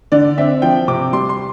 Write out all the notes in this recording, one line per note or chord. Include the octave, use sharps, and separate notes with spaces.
D3 D5
C4 E5
F3 G5
C3 D6
G3 C6
C6